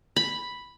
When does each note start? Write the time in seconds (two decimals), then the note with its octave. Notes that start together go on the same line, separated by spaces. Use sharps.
0.16 B5